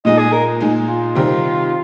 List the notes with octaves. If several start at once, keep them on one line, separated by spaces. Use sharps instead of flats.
A#2 G#3 D#4 D#5
G#4
A#4
A#2 G#3 D#4
F4
C3 D#3 G3 C4